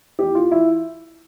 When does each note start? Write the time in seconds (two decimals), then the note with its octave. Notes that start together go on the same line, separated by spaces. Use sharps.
0.19 E2 E3 G4
0.35 F4
0.51 E3 E4